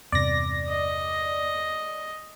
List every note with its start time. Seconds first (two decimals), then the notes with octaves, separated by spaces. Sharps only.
0.12 E2 G2 C3 D5 A#6
0.69 D#5